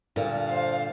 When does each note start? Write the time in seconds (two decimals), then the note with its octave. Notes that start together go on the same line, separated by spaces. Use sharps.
0.16 G2 A#2 D3
0.49 C5 F5